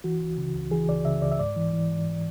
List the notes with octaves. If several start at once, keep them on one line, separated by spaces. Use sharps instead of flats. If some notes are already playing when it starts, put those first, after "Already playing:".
E3 F#4
C#2
C#3
C#2
E3 G#4
C#2 D5
C#3 E5
C#2 D5
E5
G#2 D5
E3
E3
G#2